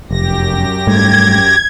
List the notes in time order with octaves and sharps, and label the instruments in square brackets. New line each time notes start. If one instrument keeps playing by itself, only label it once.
[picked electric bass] F1 [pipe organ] F#2 G4 A#6
[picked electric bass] G#2 G3 A3 [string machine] G#6